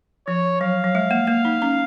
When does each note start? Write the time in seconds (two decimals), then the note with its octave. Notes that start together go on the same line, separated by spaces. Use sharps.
0.26 F3 C#5
0.61 F#3 F5
0.84 F#3
0.95 G#3
1.11 A#3
1.27 A#3
1.45 D#4
1.62 C#4